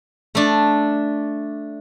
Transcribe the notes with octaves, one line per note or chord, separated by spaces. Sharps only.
A3 D4